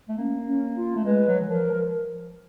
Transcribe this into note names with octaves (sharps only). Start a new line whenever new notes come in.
A3
A#3 C#4
C#4
F4
A3
G#3 B4
F#3
E3
F3 A#4
F3